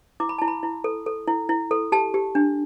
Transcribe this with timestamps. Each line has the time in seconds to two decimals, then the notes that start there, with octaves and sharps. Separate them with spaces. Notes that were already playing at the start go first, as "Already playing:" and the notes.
0.20 E4 D6
0.29 B5
0.38 E4 A5
0.48 B5
0.63 E4
0.84 A4
1.06 A4
1.28 E4
1.49 E4
1.71 A4
1.92 G4 A5
2.14 G4
2.35 D4